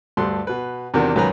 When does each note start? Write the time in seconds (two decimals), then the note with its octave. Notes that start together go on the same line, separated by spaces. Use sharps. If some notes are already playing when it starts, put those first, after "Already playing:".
0.17 D2 G2 A4 C6 F#6
0.47 B2 B4
0.94 E2 C3 D#3 D4 F#4 A#4
1.15 C#2 F#2 D#3 B4 G#5 A#5